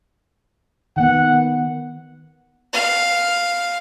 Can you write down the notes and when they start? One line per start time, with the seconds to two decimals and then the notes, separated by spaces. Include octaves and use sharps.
0.97 D#3 B3 F#5
2.73 F5